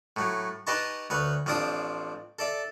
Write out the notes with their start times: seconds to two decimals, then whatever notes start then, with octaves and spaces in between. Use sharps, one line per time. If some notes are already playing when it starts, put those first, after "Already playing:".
0.16 A2 F#3
0.67 D#4 G4 B4 D#5 A5 C#6
1.10 D2 B4 C#5
1.46 A1 F3 C4 D4 G5 D#6
2.39 A4 D5 E5